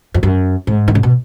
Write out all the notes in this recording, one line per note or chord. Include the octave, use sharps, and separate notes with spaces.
F2
F#2
G#2
D#3
C#3
B2